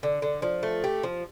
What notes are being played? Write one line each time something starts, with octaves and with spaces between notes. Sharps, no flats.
D3
D3
F3
A3
G4
F3